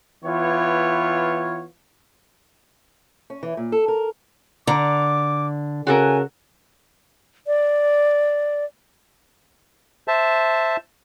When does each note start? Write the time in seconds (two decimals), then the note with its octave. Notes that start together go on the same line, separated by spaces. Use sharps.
0.24 E3 B3 F4 C#5
3.30 C#4
3.43 E3
3.57 A#2
3.72 A4
3.88 A#4
4.67 D3 A#5 D6
5.87 C#3 F#4 A4 A#4 G#5
7.47 D5
10.08 C5 E5 A5